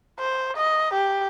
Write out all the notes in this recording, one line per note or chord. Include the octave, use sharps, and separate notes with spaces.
C5
D#5
G4